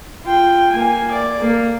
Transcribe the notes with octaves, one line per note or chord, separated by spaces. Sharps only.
F4 G5
A#3 G#5
D5
A#3